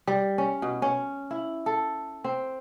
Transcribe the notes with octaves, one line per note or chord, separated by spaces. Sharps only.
G3
C#4
B2
C#4
E4
A4
C4